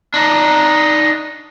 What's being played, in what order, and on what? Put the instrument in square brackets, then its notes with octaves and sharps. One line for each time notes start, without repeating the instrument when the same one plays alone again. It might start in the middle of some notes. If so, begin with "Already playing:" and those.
[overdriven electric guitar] D4 D#4